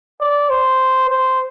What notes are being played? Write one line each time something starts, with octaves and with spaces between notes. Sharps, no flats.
D5
C5
C5